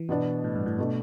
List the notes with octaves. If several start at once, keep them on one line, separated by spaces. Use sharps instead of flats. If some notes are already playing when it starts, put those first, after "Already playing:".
Already playing: E3
B2 B3 D4
A2
G2
A2
B2 A3 D4